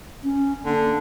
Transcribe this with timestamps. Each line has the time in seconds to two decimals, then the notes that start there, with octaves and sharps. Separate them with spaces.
0.24 C#4
0.65 D3 A#3